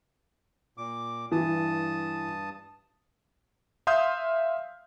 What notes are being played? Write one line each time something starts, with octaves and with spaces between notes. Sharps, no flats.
A#2 D6
G2 E3 A5 D#6
E5 F5 C6 D#6 F6 G6